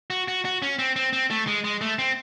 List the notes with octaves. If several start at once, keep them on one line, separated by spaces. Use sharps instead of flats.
F#4
F#4
F#4
C#4
C4
C4
C4
A3
G#3
G#3
A3
C4